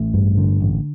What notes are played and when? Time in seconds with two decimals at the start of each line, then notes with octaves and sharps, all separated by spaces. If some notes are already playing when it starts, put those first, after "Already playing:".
Already playing: A1 A3
0.14 G2
0.37 D3
0.60 A1